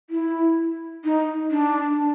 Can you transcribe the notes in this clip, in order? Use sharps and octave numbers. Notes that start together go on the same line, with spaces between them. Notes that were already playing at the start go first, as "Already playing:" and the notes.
E4
D#4
D4